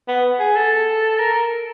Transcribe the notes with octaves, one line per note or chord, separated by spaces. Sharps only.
B3
G#4
A4
A#4